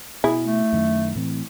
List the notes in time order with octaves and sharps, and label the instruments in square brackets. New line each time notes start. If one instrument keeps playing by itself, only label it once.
[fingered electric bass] B2 [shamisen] E4 G#4
[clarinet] A3
[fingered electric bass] F#2 D#3
A2 E3 C4